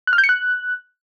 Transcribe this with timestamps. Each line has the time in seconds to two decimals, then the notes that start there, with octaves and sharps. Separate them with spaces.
0.07 F#6
0.13 F6
0.18 G6
0.24 C#7
0.29 F#6